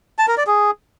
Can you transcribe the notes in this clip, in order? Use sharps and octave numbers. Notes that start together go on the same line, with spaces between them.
A5
A#4
D5
G#4